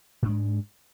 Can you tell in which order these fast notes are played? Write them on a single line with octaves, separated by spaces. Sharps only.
G#2 D4 G#3